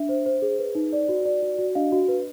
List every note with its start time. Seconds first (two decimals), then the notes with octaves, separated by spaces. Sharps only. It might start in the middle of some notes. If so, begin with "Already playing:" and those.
Already playing: D4 E5
0.09 C5
0.26 C5
0.42 G#4
0.59 B4
0.75 D#4
0.93 D5
1.09 F#4
1.25 D5
1.42 F#4
1.58 F#4
1.75 D4 D#5 F5
1.92 F#4
2.08 B4